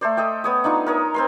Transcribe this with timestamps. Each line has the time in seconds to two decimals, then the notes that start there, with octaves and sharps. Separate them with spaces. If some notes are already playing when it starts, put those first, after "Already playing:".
0.01 A3 A4 C5 D5
0.17 A4 D#5 E5 G5
0.44 B3 C#5 D#6
0.64 D4 D#4 F4 C#6
0.86 A#4 C#5 D#5
1.14 C4 A#4 C6